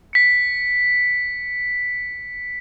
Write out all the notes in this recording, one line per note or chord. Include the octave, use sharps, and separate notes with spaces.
B6 C#7